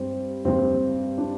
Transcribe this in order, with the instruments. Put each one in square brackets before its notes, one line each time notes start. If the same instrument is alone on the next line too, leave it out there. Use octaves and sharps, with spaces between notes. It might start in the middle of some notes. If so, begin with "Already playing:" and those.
Already playing: [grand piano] G2 G3 C4
G2 G3 C4
D4